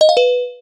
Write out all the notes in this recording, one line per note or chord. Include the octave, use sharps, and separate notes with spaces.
D#5
F5
B4